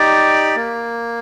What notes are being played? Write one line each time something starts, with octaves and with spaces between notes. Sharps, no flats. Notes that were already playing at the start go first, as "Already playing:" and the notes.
Already playing: D#4 G4 D5
A#3